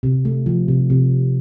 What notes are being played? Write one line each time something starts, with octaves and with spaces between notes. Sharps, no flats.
C3
A3
F3
C3
C3
A3